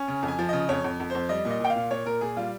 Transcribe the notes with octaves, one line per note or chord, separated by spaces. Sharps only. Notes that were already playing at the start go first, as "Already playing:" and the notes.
Already playing: C#4
C#3
F2
G#5
F3
C#3 D#5
F2 C#5
F2
F2
F2 C5
G3 D#5
A#2
D#5
A#2 G5
F5
A#2
A#2 C#5
A#2 A#4
A#2 G#4
G3 F4